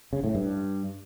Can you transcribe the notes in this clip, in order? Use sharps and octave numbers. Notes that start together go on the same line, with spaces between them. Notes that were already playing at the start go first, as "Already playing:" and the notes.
C#3
A2
G2